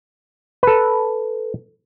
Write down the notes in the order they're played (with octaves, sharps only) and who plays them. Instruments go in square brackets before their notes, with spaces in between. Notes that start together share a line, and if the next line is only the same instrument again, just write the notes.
[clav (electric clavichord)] A4 B4